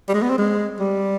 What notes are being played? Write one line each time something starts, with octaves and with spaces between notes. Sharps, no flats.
G3
G#3
B3
C4
G#3
G3